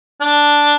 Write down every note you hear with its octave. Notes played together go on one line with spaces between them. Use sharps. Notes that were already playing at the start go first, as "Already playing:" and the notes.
D4